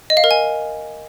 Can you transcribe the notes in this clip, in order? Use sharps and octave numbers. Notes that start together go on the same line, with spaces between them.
D#5
F5
A#4
G#5